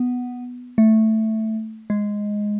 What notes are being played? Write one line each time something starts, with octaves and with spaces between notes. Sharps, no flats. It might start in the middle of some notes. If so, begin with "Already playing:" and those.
Already playing: B3
A3
G#3